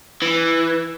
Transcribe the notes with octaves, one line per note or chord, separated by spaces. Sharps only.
E3